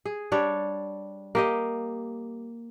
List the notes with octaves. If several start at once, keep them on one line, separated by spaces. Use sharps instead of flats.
G#4
G3 D4 C#5
A#3 G4 D#5